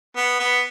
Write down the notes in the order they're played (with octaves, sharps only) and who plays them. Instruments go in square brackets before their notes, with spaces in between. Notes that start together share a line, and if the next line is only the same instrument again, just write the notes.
[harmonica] B3
B3